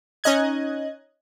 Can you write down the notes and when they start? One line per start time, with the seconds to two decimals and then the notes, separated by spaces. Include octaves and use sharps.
0.24 C#4 D#4 D#5 F#6 G#6